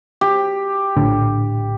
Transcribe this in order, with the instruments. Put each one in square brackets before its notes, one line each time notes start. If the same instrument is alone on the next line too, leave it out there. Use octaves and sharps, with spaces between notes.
[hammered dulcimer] G4
[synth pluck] A#1 A2 [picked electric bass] D3